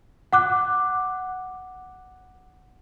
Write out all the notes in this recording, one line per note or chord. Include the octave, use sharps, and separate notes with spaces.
F#5 D6 F#6